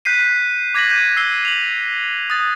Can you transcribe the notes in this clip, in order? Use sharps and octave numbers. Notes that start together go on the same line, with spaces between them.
F#6 G6 B6 C7 D#7
D6 G#6 A#6 B6 F#7
G6 D#7
E6 C7 G7
F7 F#7
D#6 F#6 A6